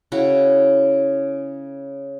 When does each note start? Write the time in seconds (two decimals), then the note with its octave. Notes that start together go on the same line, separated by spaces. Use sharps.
0.12 C#3 E4 F#4